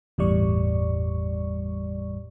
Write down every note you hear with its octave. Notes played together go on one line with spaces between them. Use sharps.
G1 E2 A2 G3 D5 C#6